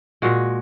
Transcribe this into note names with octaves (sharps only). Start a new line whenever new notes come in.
A#2 G#3 F#4